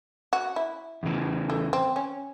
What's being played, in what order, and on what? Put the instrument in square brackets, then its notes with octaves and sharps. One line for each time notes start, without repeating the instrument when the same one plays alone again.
[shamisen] F#4
E4
[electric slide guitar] E2 C#3 E3
[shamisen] A3
C4
C#4